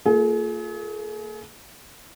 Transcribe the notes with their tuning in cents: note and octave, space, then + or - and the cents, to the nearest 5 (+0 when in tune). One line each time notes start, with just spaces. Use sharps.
A#3 -25 F4 +0 G#4 +35